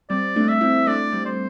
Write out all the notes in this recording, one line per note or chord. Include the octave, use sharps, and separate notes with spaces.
G3 C4 D5
A3 D4
E5
C4 E4
A3 D4 D5
G3 C4
C5